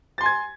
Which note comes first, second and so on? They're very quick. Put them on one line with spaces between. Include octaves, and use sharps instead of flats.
A6 C6 G#5 G#6